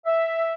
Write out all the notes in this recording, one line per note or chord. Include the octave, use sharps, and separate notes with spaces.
E5